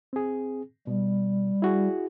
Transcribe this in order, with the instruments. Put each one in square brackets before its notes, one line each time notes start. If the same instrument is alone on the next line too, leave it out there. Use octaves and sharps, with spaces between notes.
[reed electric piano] C4 G#4
[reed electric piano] B2 [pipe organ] G3
[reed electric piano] E4 F#4 G#4